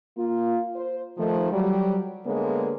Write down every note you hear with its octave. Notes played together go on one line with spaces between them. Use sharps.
A#3 F4
C5
D#3 F3 A3
F#3 G3
D3 G#3 A#3 B3 G#4 C#5